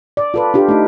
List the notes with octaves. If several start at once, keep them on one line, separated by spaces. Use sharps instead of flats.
D5
F4 A4 B4
D4 F4 G4
A3 D#4